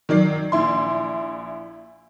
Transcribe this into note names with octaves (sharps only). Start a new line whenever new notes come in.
D#3 F#3 D5 C7
A#1 E4 C6